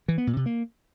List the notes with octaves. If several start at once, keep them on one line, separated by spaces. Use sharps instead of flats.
E3
B3
A#2
C3
A#3